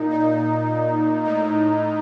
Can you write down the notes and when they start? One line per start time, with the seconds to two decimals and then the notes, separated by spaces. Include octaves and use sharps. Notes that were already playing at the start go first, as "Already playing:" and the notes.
Already playing: A#2 D#4
0.10 D#4
1.25 A2 D#4